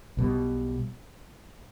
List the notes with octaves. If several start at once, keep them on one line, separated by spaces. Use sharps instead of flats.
B1 B2 G3